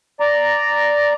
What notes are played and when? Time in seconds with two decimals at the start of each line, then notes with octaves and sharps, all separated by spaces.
0.20 D5 A#5